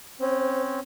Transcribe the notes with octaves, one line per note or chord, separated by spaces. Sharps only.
C4 C#4 C5